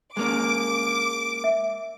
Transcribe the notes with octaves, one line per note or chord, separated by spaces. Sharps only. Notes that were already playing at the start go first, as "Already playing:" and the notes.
G#3 A#3 C#4 D6
E5